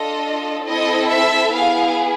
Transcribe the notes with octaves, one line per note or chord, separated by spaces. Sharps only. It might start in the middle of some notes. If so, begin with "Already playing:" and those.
Already playing: D4 F4 A4 D#5
C4 E4 A4 D#5
E5
B3 E4 G#4 F5